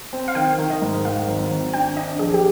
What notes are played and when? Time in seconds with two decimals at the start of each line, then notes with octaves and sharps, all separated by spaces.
0.13 C4
0.28 F5
0.35 D#3 G5
0.59 D#3
0.70 D#5
0.82 G#2
1.05 D#3 F5
1.28 G#1
1.51 G#1
1.74 D4 G5
1.96 D4 D#5
2.19 A#1 G#4
2.34 G4